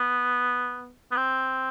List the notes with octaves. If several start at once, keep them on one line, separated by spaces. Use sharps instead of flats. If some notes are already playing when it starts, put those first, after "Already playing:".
Already playing: B3
B3
C4